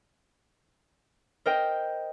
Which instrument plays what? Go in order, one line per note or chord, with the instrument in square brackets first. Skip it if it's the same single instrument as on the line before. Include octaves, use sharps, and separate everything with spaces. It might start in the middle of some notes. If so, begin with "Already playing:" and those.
[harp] A#4 C5 D#5 G5